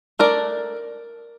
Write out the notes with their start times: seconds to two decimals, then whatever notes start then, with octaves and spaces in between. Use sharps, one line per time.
0.19 A3 D4 A#4 D5